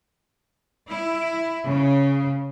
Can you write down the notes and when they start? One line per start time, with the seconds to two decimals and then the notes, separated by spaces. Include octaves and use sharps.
0.87 E4
1.66 C#3